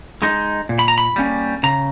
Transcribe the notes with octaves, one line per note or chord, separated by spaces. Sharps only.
G#3 D#4
A#2
B5
A#5
B5
G3 A#3 C#4
C#3 A#5